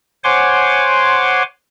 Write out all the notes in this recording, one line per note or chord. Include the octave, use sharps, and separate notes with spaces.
C5 C#5 F#5 G#5 C6 D6